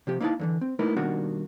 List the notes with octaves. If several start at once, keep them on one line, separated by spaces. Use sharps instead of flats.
C3 F3 G4
A#3 D#4 E4 B4 F5 A5
E2 D3 E3
C4
A3 A#3 D#4 E4 A#4 B4
B2 D#3 G3 A#3 D4 F#4